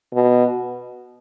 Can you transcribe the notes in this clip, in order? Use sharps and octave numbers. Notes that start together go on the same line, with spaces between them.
B2